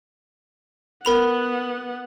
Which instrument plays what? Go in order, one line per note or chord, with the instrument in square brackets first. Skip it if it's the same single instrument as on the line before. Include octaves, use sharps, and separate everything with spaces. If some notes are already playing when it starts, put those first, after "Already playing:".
[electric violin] B3 F#5 [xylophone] A#4 B5 F7